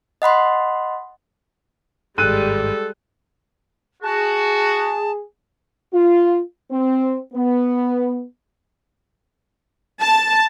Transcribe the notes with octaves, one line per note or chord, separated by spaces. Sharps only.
D#5 F#5 B5 C6
G#1 G2 G3 G#3 A4 F#6 D#7
F#4 G#4 A5
F4
C4
B3
A5